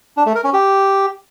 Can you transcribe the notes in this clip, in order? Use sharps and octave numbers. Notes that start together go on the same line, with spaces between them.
D4
A3
A#4
C#4
G4